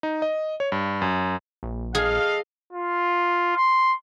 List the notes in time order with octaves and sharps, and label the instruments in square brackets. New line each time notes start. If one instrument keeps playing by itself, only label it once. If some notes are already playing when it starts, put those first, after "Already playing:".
[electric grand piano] D#4
D#5
C#5
G2
F#2
[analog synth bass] A#1
[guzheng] G#4 [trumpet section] A4 D#5 F5
[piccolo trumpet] F4
C6